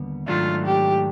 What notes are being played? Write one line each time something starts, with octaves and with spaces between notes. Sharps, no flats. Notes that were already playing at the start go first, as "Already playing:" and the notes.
Already playing: D#2 D3 G3 B3
G#2 D#3 F#3 A3 D4 F4
G4